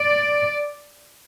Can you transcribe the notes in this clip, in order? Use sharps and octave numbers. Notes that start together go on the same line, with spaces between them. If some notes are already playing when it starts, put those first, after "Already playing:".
Already playing: D5